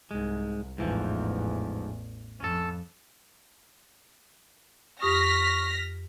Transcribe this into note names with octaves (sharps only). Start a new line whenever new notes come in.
C2 G#2 G#3
A1 E2 G#2 E3 F3
F2 C#4 A4
F2 G4 C#6 D#6 F6 A#6 B6